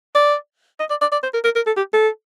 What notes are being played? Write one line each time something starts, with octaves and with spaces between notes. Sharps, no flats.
D5
D#5
D5
D5
D5
C5
A#4
A#4
A#4
A4
G4
A4